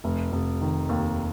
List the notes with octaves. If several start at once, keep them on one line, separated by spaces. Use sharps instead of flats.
F1
F1
D#3
D#2